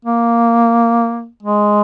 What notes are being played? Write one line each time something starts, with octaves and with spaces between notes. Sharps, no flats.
A#3
G#3